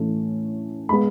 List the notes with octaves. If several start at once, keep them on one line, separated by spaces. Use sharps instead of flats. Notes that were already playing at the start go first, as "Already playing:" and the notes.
Already playing: A2 E3 A3 C#4
G#3 B3 B5